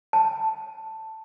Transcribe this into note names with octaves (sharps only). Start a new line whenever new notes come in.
A5